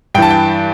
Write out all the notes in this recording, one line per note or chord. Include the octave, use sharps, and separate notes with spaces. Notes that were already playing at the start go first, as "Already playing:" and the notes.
G2 E3 G5 A5
G5